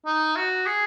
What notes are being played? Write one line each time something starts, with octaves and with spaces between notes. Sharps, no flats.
D#4
F#4
G#4